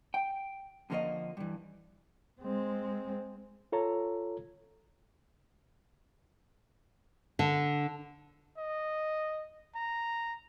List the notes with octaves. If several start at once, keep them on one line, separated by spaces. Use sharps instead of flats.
G5
F2 D3 F3 A#3 F#4 D#5
G2 E3
G#3 C4
F4 A4 C#5 A#5
D3
D#5
A#5